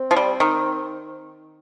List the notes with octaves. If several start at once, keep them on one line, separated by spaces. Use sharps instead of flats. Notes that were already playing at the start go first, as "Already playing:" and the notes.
Already playing: C4
F3
G3
D#3